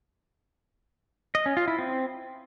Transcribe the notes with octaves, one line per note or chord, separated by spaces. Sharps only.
D#5
C#4
F4
E4
C4